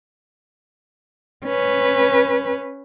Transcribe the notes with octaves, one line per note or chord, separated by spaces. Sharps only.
C#4 B4